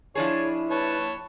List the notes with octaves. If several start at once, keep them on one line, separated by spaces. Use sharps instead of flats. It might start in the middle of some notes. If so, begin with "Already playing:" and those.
F3 D4 E4 G#4 C#5
B4 C#5 A5